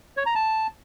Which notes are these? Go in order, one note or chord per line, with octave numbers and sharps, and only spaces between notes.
C#5
A#5
A5